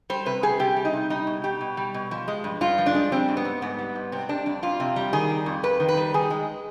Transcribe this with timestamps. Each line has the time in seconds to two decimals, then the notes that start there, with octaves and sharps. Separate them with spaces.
0.10 G3 C5
0.26 C3 B4
0.43 G3 G#4
0.59 C3 G4
0.76 G3
0.85 D#4
0.93 C3
1.10 G3 D#4
1.27 B2
1.44 G3 G4
1.61 B2
1.77 G3
1.94 B2
2.11 F3
2.28 G#3
2.44 G2
2.61 G2 F4
2.78 F3
2.86 D4
2.95 G#3
3.12 G3 C4
3.28 G#2
3.37 B3
3.45 G3
3.62 G#2 B3
3.79 G3
3.95 G#2
4.12 C3 C4
4.29 G3 D4
4.46 F2 D4
4.63 F2 F4
4.80 C3
4.96 G3
5.13 D#3 G#4
5.30 G3
5.46 F2
5.63 F2 B4
5.80 D#3
5.88 B4
5.97 G3
6.14 D#3 G#4
6.30 G#3